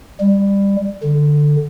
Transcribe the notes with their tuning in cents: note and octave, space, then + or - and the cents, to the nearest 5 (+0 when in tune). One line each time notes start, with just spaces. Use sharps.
G3 +20
D3 +10